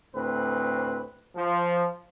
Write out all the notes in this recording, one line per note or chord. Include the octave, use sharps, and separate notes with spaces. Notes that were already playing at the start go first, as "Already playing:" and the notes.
D2 A2 C4 B4
F3